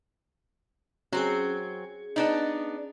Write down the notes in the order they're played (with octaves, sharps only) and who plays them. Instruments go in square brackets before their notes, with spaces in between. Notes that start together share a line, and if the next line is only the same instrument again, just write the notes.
[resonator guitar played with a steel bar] F#3 C4 [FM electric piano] C#4 G#4
[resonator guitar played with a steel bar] B3 D4 D#4